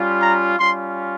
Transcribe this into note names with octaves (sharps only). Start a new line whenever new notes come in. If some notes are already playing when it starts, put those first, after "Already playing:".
Already playing: G3 C#4 F4
A#5
G3 C#4 F4 C6